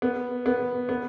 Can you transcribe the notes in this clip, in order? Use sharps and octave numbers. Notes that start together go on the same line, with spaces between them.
B3
B3
B3